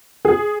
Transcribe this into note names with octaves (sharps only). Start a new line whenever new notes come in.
G#4